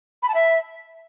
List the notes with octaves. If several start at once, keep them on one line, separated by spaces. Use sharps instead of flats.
B5
A5
E5